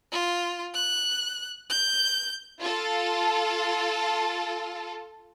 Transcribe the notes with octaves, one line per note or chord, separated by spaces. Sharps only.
F4
F#6
G6
F4 A4